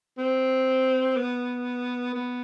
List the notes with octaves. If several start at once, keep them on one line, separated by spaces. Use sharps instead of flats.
C4
B3
B3